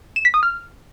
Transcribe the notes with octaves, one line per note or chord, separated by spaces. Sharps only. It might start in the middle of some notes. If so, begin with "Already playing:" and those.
E7
B6
D#6
F6